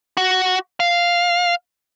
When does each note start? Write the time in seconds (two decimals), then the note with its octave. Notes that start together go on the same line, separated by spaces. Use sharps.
0.17 F#4
0.80 F5